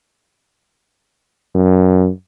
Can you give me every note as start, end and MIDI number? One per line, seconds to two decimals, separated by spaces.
1.55 2.10 42